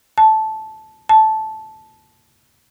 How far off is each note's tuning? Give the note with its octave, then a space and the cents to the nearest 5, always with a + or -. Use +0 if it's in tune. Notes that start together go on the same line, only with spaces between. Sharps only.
A5 -10
A5 -10